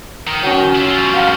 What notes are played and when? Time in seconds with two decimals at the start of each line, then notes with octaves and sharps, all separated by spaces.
0.27 D#3
0.43 F#3 C#4
0.75 E4 F4
0.96 F3 G3
1.14 F5 F#5 A#5